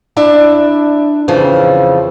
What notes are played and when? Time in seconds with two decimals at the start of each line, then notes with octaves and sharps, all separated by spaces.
0.17 D4 E4 E5
1.28 F2 C#3 E3 F3